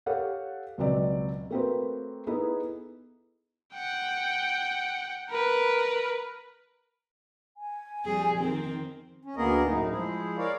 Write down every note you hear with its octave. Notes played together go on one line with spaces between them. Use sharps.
G4 A4 C#5 F5 F#5
C#2 B2 F#3 C4 D5
A3 A#3 C4 F#4 B4 C5
B3 D#4 E4 G#4 A4
F#5 G5
A#4 B4
G#5
F2 G3 G#4
D#3 C4
C#4
D2 A#3 B3 G#4 A#4 D#5
F#2 A2 D#4
F3 G#3 E4 G#4
A#4 C#5 D5 F5